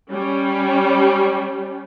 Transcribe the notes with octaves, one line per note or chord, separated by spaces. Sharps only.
G3 C#4